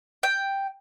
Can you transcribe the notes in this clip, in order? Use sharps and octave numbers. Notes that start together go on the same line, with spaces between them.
G5